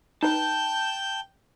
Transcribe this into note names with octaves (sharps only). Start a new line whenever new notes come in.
D#4 B4 G5 A5 G6